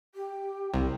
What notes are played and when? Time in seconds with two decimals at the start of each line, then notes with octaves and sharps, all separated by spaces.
0.15 G4
0.74 C2